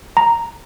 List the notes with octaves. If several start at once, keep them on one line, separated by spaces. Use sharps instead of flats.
A#5